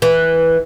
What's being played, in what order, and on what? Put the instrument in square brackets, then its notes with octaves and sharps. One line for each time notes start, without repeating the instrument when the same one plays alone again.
[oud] E3